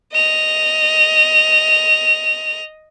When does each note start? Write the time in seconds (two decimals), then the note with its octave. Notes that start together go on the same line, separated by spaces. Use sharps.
0.13 D#5 F7